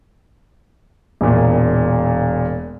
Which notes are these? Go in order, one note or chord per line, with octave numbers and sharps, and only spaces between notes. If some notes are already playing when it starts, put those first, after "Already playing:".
E1 A#2